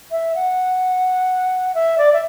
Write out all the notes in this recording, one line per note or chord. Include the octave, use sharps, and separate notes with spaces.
E5
F#5
E5
D5
E5